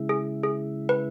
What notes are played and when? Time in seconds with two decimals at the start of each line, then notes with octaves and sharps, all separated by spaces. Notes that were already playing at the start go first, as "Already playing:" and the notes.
Already playing: C#3 G#3 E4
0.09 G#4
0.43 G#4
0.89 B4